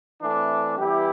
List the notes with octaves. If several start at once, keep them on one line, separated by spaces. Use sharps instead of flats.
E3 A3 C4 D4
E3 G3 B3 E4 G4